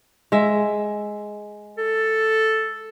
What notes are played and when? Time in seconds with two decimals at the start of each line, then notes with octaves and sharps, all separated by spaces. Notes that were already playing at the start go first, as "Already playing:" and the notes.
0.32 G#3 E5
1.78 A4